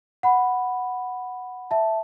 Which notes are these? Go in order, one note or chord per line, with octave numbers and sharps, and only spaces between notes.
F#5 B5
E5 A5